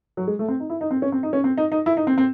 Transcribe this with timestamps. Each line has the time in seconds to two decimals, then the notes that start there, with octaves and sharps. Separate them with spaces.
0.17 F#3
0.27 G#3
0.39 A3
0.48 C4
0.60 D#4
0.70 E4
0.81 D#4
0.91 C4
1.02 C#4
1.12 C4
1.23 D#4
1.33 C#4
1.44 C4
1.58 D#4
1.72 D#4
1.86 E4
1.97 D#4
2.07 C4
2.18 C4